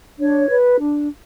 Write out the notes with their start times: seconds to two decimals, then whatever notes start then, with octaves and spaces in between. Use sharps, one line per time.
0.19 D4 C#5
0.49 B4
0.80 D4